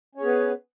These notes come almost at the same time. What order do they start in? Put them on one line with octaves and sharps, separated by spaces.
C#4 C#5 G#4 B3 B4